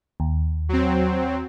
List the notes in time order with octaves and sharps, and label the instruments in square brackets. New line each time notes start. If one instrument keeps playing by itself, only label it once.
[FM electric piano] D#2
[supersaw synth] F#3 C4